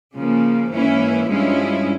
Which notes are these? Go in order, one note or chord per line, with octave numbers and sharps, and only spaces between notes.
C#3 F3 A#3
G#2 E3 A#3 C#4 E4
G2 F3 G#3 C#4 E4